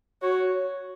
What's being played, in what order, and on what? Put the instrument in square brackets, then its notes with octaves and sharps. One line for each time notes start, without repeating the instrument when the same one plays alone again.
[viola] F#4 [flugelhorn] C#5